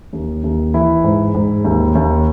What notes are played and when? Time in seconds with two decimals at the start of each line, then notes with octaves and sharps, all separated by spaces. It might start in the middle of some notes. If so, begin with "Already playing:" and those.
0.13 D#2
0.44 D#2
0.74 E3 E4
1.04 G#2
1.34 G#2
1.65 D#2
1.95 D#2